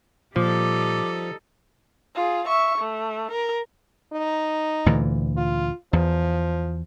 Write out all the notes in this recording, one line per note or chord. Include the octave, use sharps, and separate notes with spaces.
A#2 F3 G3 D#4 A4 D6
F4 G#4
E5 C#6
A3
A#4
D#4
D2 A#2 E3
F4
E2 F3